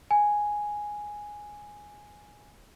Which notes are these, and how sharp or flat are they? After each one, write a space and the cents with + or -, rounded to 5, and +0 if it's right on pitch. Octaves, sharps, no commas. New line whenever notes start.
G#5 +0